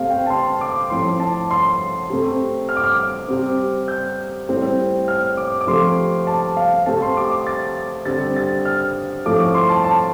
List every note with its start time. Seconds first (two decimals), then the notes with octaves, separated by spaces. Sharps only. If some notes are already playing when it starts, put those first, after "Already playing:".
Already playing: C3 A3 C4 F5
0.10 G5
0.27 A5
0.30 C6
0.61 D6
0.90 A2 F3 C4 C6
1.20 A5
1.51 C6
2.10 C3 A3 C4
2.69 F6
2.77 D6
2.84 F6
3.28 C3 G3 C4
3.88 G6
4.49 A2 G3 C4
5.08 F6
5.37 D6
5.61 D6
5.67 C3 F3 A3 C4 C6
6.27 A5
6.57 F5
6.86 C3 A3 C4 A5
7.02 C6
7.17 D6
7.31 D6
7.47 A6
8.05 D3 G3 C4 A6
8.36 A6
8.65 F6
9.26 A2 F3 A3 C4 D6
9.40 D6
9.55 C6
9.69 A5
9.84 A5